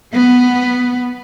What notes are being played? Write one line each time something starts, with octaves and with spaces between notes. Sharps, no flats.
B3